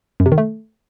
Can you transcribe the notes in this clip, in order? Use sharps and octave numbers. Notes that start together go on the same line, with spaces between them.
F#2
C3
D#3
A3